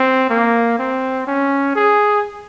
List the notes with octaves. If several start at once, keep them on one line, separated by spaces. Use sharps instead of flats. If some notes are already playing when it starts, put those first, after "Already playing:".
Already playing: C4
A#3
C4
C#4
G#4